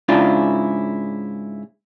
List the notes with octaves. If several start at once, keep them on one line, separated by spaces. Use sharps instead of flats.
G#2 C#3 D4 E4 F4